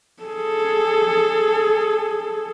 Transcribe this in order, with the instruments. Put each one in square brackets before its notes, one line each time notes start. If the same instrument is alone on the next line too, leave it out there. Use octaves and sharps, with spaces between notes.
[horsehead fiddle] G#4 A4